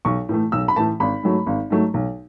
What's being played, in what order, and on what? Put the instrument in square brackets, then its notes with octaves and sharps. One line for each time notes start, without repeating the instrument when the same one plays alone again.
[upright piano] B1 C#6
A2 E3 A3
B1 E6
B5
A2 E3 A3 A5
G#1 B5
G#2 F#3 A3
G#1
G#2 F#3 A3
B1